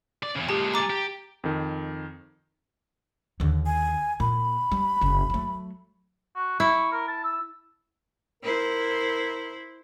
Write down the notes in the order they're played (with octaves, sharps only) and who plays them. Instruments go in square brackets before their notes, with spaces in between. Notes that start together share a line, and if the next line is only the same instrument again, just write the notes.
[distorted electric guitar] D5
E2 C#3
[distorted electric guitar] A#2 G#3 [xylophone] G4 A5
[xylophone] A#5 D6 A6
[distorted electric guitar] G4
[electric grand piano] F2 D#3
[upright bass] D#2 D3
[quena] G#5
[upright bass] A#2 [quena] B5
[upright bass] G3
F#1 C#3
F#3 A3
[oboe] F#4
[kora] E4 [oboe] C#6
[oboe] A#4
A5
E6
[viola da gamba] E4 C5 [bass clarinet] A#4